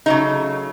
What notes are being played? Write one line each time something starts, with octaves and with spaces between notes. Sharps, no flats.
C#3 F#3 A3 D#4